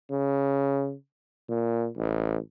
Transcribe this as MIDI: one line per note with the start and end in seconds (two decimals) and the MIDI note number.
0.11 0.95 49
1.49 1.88 46
1.96 2.37 33